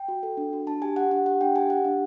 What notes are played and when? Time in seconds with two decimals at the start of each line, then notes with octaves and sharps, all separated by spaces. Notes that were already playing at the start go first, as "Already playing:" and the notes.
Already playing: G5
0.08 F#4
0.23 A4
0.37 D4
0.53 F#4
0.67 D4 A5
0.82 G4 G#5
0.96 G4 F#5
1.11 D4 F#5
1.26 G4 F#5
1.41 D4 G5
1.55 G4 G#5
1.70 G4 F#5
1.85 D4 F5